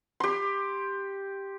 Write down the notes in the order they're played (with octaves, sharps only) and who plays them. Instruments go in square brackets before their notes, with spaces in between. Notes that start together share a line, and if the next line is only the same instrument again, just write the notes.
[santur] G4 C6